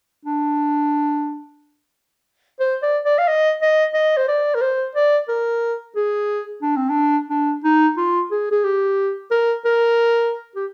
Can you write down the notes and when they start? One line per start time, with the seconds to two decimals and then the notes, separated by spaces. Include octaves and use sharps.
0.25 D4
2.60 C5
2.83 D5
3.05 D5
3.19 F5
3.28 D#5
3.62 D#5
3.94 D#5
4.17 C5
4.28 D5
4.55 A#4
4.62 C5
4.95 D5
5.28 A#4
5.96 G#4
6.62 D4
6.76 C4
6.89 D4
7.30 D4
7.64 D#4
7.97 F4
8.31 G#4
8.52 G#4
8.65 G4
9.31 A#4
9.65 A#4
10.56 G4